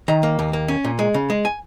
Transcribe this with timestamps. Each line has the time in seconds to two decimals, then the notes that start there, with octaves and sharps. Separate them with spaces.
0.08 D#3 A#5
0.23 A#3
0.39 D#2
0.53 A#3
0.68 C#4
0.84 A#2
0.99 G#3
1.14 C#3
1.30 G#3
1.45 G#5